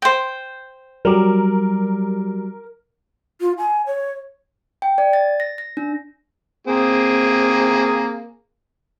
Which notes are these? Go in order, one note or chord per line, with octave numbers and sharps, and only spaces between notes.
C5 G5
F#3 G3 A#4 D6
F4
G#5
C#5
G5
D5
A6
A#6
A#6
D4
A#3 C4 G#4